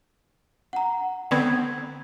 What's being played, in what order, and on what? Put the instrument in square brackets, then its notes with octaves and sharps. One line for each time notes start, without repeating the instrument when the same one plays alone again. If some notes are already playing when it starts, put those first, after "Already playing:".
[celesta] F#5 A#5
[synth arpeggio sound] D3 B3 C4 [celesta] G#6